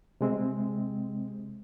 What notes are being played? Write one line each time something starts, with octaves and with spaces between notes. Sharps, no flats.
C3 G#3 C4